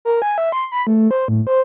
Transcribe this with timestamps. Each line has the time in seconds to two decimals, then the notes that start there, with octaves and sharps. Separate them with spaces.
0.05 A#4
0.22 G#5
0.38 E5
0.52 C6
0.72 B5
0.87 A3
1.11 C5
1.28 A2
1.47 C5